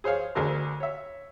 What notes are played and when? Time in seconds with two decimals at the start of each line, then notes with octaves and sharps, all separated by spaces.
0.04 G#4 C5 C#5 F5
0.35 D2 D3 D4 G#4 A#4 C5
0.80 C#5 E5